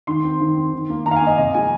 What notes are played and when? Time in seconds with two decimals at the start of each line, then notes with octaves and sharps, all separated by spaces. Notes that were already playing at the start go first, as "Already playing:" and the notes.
0.07 D#3 C6
0.23 C4
0.40 D#3
0.56 C4
0.73 D#3
0.90 A#3
1.05 D#3 A#5
1.11 F5
1.16 G#5
1.21 A#3
1.27 D#5
1.37 C3 D#5
1.54 F3 G#3 G#5